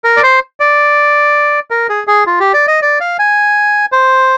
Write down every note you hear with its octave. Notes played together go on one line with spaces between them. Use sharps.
A#4
D5
C5
D5
A#4
G#4
G#4
F4
G4
D5
D#5
D5
F5
G#5
C5